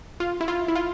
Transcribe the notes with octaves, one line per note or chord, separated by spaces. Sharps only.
F4
E4
F4
E4
F4